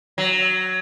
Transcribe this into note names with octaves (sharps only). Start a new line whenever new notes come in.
F#3